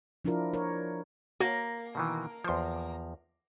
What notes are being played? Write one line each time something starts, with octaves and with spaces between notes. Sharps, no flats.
F3 D4 E4 F4 A#4
A#4 C#5
A#3 F#4 C#5
B2 D#3 E3
E2 F3 C5 C6